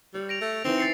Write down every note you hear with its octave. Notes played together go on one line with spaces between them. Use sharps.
G3 C#5
A#6 D7 F7
A3
E3 C4 D#4
A6 C7 C#7